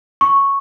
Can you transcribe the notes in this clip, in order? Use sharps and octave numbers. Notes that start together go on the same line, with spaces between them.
C#6